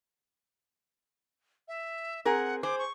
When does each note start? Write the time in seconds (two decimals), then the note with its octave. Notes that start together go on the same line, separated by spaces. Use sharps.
1.68 E5
2.25 C4 G#4 A#4 F#5
2.63 G#4 C5 D6
2.79 C#6